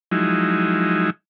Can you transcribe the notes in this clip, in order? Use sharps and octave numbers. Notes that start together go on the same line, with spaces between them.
F3 F#3 G#3 D#4 E4